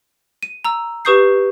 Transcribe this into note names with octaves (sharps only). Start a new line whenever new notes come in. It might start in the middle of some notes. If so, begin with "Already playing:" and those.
D#7
A#5 E6
G4 B4 C#6 D#6 G6 C7